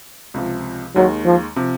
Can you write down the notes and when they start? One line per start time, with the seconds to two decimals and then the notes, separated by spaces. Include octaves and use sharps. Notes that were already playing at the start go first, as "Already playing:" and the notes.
0.34 C#2 C3 F3
0.96 D#2 D#3 F#3 G#3
1.26 F3
1.56 C3 F3